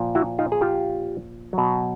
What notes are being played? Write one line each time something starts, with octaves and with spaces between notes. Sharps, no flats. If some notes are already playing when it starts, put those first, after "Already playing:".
Already playing: A#2 F3
E4 F#4
D#4 F4
G#4
F4 G4
B2 F#3